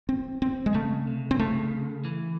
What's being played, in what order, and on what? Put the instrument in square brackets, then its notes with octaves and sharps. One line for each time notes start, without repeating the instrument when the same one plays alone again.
[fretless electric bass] C4
C4
G#3
[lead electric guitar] C#3 [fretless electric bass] A3
[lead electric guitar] C3
[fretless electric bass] C4
[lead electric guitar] C#3 [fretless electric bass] A3
[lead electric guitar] E3